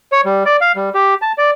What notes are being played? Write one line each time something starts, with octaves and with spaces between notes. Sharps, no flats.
C#5
G3
D5
F5
G3
G4
A5
D5